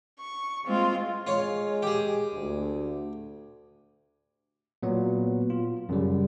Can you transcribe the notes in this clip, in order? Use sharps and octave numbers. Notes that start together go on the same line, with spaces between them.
C#6
G#3 C4 F4
G#3 F4 C#5
G4 G#4
D2
A#2 F#3 B3
F4
F#2 C#3 G3